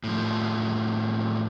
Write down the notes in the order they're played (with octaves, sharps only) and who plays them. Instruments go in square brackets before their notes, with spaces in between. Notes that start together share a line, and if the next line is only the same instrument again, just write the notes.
[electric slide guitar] A2 F3